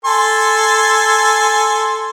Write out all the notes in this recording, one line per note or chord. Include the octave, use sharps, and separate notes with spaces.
A4 G#5 C6